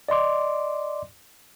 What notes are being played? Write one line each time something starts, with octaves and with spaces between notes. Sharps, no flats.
D5 D#5 C6 D6